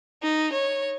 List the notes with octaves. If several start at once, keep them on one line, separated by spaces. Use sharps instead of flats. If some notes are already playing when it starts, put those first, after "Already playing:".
D#4
C#5